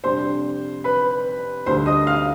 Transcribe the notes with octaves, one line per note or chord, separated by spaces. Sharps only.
F2 C3 G3 D4 C5 C6
B4 B5
D2 D3 G3 C5 C6
D#5 D#6
F5 F6